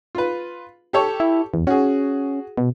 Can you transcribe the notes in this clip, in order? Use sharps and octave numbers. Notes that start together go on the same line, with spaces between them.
F4 B4
G4 A4 C#5
E4
E2
C#4 F#4 G#4
B2